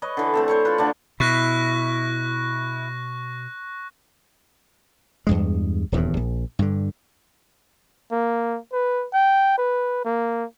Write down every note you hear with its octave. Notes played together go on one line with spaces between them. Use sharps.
B4 C#5 D#5
D3 E3
A3 C4 A4
C5 C#5 C#6
F4 B4
D3 A3 D4
B2 E4 C#6 F#6 A#6
E2 G2 G#3
D#1 E2 G2
A#1
G2 D3
A#3
B4
G5
B4
A#3